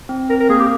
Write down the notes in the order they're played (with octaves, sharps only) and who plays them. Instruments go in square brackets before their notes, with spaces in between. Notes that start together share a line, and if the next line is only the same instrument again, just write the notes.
[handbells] C4
[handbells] C4 [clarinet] A#4
[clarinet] A#4
[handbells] A#3 [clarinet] G#4
[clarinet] G4